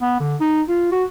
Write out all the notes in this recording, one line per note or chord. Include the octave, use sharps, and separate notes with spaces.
B3
D3
D#4
F4
F#4